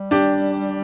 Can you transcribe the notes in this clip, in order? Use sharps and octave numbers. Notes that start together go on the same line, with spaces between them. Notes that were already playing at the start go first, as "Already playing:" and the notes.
Already playing: G3
D4 G4